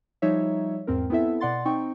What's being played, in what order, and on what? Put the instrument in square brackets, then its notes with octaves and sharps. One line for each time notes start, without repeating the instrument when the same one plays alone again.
[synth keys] F3 G3 D#4 C#5 E5
E2 G#2 C4 A#4
B3 C4 E4 A4 E5
B2 D5 F#5 C6 A6
C4 D#4 G5 C#6